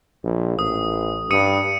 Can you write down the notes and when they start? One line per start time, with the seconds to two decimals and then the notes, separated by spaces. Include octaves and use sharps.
0.24 A#1
0.59 A1 D#6
1.31 G2 D#6 C#7 D#7